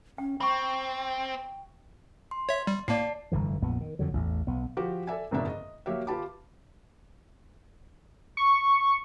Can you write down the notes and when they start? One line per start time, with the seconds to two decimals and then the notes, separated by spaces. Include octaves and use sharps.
0.18 C#4 G5
0.40 C4 G5 B5 C#6
2.31 C6
2.49 C#5 E5
2.67 G3
2.88 A2 A#3 D5 A5 C7
3.32 F1 G2 D3 E3
3.62 A#1 F2 A#2 B3
3.81 D#3
3.99 F2 D3 F#3
4.13 A1 E2 A2
4.47 B1 B3
4.77 F3 F#4 G4
5.07 A4 D5 E5 G#5
5.31 F#1 F2 G#2 B2 D4 E5
5.47 D#5
5.86 F#3 A#3 G4 C#5 E5
6.07 F4 G4 B4 A5 B5 D6
8.37 C#6